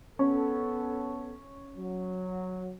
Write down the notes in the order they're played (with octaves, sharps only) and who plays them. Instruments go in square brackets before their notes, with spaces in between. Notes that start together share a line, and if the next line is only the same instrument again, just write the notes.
[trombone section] B3 A4 [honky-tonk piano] C#4
[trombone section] F#3